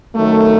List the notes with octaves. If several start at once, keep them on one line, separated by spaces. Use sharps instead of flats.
F#2 D#3 F#3 A3